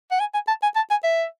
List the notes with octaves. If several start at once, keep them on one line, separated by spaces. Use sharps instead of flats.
F#5
G#5
G#5
A5
G#5
A5
G#5
E5